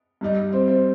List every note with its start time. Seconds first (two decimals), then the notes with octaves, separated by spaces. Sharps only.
0.21 G2 G3 D#4
0.52 C4
0.68 C4